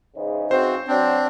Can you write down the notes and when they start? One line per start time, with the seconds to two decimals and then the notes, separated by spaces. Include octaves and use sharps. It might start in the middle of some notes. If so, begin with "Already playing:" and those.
0.16 G#2 C#3 E3
0.51 C4 F#4 C5
0.88 F#3 C4 D4